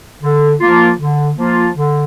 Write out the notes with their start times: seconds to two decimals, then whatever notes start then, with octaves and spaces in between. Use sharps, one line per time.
0.22 D3
0.60 F3 A#3 F4
1.00 D3
1.38 F3 A#3 F4
1.76 D3